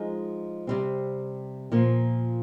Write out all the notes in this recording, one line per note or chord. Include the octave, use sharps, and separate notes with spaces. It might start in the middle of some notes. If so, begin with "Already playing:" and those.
Already playing: F3 G#3 D#4 G#4
C3 G3 C4
A#2 F3 A#3